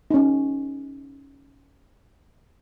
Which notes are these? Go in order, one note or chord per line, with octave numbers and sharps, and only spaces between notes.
C#4 D#4